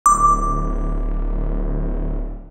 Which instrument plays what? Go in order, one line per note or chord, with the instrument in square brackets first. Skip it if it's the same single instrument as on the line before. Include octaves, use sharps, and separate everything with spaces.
[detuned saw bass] D1 [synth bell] D6